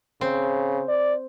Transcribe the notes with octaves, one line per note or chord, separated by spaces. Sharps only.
C#3 C4
D5